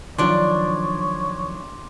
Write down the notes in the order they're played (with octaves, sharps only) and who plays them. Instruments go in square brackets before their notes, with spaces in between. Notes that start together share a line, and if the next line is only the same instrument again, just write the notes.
[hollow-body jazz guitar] D#3 F3 F#3 [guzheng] D4 D5 [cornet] C#5 [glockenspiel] C6 D6